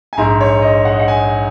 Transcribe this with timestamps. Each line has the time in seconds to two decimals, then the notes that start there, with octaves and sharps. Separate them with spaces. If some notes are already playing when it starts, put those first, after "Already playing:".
0.13 G#5
0.17 A#1 G#2 G#3 A#5
0.41 C#5
0.62 D#5
0.85 F#5
0.92 D#5
1.00 F#5
1.08 G#5